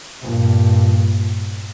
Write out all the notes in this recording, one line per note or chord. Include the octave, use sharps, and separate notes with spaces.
G2 A#2